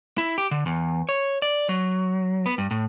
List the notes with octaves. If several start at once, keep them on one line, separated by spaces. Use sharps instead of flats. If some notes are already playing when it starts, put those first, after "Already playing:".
E4
G4
D3
E2
C#5
D5
F#3
B3
G2
A2